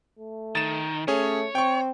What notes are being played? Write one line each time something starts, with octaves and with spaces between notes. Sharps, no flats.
A3
D#3 A6 E7
A3 C#4 G#4 C#5
C4 G5 C#6